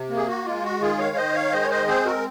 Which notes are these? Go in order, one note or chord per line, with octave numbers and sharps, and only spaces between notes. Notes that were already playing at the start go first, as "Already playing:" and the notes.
Already playing: C3
A#3
G#4
F#4
G#3 F4
F#4
D#3 F4 G#4
C#5 F5
D#3 C5 D#5
C#5 F5
G#3 C5 D#5
C#5
C5 D#5
C4 G#4 C5
F#4 A#4